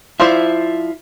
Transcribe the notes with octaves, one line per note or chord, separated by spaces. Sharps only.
F3 E4 F4 C5 D5 E5